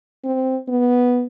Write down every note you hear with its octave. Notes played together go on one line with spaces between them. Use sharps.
C4
B3